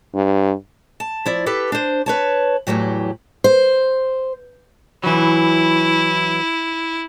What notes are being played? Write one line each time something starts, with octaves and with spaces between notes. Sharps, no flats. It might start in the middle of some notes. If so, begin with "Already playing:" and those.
G2
A5
F3 E4 D5
G4 A4 B4
D4 C5
B4 C#5 A5
E2 A2 C3 F#3 G4
C5
E3 F#3 E4